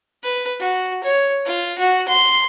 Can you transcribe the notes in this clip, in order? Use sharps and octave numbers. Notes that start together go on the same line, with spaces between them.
B4
F#4
C#5
F4
F#4
C6